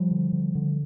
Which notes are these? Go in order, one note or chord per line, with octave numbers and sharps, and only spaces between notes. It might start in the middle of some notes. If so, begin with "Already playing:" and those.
Already playing: F3 G3
D3
D3
D3